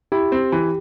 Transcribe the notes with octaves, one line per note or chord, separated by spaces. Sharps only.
E4 G4
C4
E3